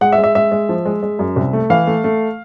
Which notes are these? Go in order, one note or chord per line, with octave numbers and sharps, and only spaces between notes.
G#3 F#5
E5
G#3
E5
G#3 E5
G#3
F3
G#3
G#3
F#2
C2
A3
E3 F5
A3
A3